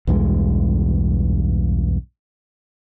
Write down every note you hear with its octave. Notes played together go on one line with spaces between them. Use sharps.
B1 E2 G2 G#3